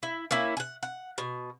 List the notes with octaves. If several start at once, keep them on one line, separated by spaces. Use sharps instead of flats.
E4
A#3 C#4 E4
F#5 G#5
F#5
B2